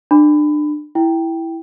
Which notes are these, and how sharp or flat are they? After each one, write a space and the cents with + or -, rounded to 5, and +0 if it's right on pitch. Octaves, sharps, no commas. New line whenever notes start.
D4 +30 B5 +25
E4 +0 G5 +0